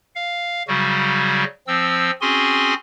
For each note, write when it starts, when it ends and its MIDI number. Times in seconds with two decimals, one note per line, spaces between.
0.15 0.63 77
0.68 1.44 49
0.68 1.44 54
0.68 1.44 55
0.68 1.44 66
1.67 2.11 53
1.67 2.11 60
1.67 2.11 88
2.21 2.74 60
2.21 2.74 61
2.21 2.74 66
2.21 2.74 68
2.21 2.74 80
2.21 2.74 84